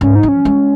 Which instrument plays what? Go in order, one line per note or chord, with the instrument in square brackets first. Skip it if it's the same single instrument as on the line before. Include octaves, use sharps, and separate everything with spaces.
[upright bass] G#2 [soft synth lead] C#4
[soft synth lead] D#4
[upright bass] F3
[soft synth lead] C#4
[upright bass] G#3